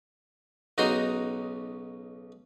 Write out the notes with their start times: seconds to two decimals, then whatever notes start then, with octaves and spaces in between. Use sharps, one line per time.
0.78 B1 C#3 D#4 F#4 A#5 C6